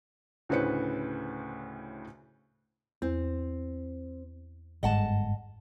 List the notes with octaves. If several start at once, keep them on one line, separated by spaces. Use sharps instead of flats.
D2 A2 C#3 B4 C5 C#7
E2 C4
G1 G#2 D#5 F#5 A5